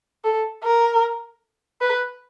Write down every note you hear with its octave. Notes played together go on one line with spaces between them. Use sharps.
A4
A#4
B4